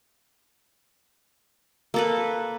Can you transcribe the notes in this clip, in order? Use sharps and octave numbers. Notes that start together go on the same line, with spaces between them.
A#3 A4 B4